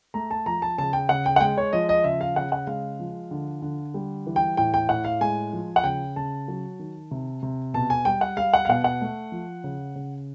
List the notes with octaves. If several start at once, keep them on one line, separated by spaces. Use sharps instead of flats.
A3 A#5
A5
F3 A#5
A5
C#3 A5
G5
C#3 F#5
G5
F#5
G#3 G5
C#5
F3 D#5
D#5
C#3 E5
F5
C#3 F#5
F#5
G#3 F5
F3
D3
D3
G3
E3
G5
A2 G5
G5
A2 F#5
F5
G#3 G#5
F3
F#5
C#3 G5
C#3 A5
F#3
D#3
C3
C3
B2 A5
G#5
G3 G5
F#5
G3 F5
F#5
F5
B2 F#5
F#5
A3
F3
C#3
C#3